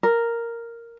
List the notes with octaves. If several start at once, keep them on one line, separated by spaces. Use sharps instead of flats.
A#4